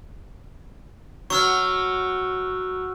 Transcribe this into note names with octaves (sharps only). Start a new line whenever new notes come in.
F#3 C#6 E6 F6